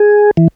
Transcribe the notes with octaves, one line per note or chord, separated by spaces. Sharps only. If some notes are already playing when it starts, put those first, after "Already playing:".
Already playing: G#4
E3